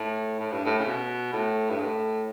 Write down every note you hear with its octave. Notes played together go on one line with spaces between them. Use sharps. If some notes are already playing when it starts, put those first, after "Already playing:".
Already playing: A2
A2
G2
A2
C#3
B2
A2
G2
A2